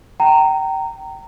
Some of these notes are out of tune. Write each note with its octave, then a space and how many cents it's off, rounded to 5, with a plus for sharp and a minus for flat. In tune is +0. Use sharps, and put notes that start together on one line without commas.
G5 -25 A#5 -15